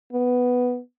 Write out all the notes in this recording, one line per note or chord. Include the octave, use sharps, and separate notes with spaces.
B3